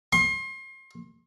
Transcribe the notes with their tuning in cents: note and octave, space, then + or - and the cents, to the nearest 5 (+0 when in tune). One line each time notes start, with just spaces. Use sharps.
C6 +35